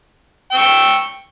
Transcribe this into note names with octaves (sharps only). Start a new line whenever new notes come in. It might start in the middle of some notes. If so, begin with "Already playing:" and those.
G5 C#6 E6